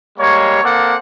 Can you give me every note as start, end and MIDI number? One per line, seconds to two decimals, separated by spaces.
0.19 0.63 55
0.19 0.63 56
0.19 0.63 58
0.19 0.63 73
0.63 0.96 58
0.63 0.96 60
0.63 0.96 69
0.63 0.96 74
0.63 0.96 78